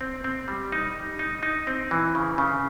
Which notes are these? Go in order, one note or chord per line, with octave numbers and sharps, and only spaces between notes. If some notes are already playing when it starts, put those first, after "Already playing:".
C4
C4
G3
D#4
G3
D#4
D#4
C4
E3
C#3
C#3